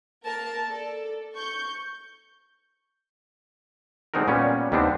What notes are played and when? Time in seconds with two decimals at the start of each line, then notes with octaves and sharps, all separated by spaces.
0.24 A#3 A#4 A5
0.67 A4 D5
1.34 C#6 G6
4.14 D3 G#3 C4 D#4 F#4 A#4
4.28 A#2 G3 B3 C#4
4.72 D#2 G3 B3 C4 D4